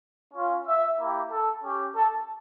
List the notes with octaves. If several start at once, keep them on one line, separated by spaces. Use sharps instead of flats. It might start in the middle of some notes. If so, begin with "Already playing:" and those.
C#4 F4
E5
A#3 E4 G4
A4
C#4 G4
A4